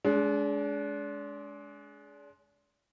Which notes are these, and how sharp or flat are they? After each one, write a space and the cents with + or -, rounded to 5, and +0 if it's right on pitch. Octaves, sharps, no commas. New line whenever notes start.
G#3 +15 D4 -35